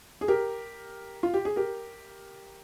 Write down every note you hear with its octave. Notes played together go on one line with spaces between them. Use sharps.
G#4
G4 A#4
F4
G4
G#4
G4 A#4